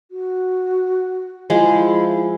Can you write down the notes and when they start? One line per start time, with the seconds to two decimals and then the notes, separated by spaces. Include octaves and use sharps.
0.11 F#4
1.50 F3 G#3 E4